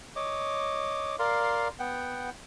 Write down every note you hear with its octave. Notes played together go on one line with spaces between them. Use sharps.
C#5 D#5 D6
A#4 D5 F5 C6
B3 F#5 G5